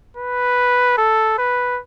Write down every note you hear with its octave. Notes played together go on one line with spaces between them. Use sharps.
B4
A4
B4